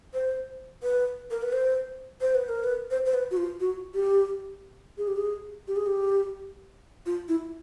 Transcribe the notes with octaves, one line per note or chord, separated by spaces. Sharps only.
C5
B4
A#4
B4
C5
C5
B4
A#4
B4
C5
C5
B4
F#4
F4
F#4
G4
G#4
G4
G#4
G4
G#4
G4
F4
E4